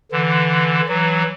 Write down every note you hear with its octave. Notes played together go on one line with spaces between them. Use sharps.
D3 E3
E3 F#3